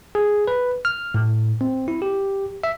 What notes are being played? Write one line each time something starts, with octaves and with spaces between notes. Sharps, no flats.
G#4
B4
F6
A2
C4
E4
G4
E5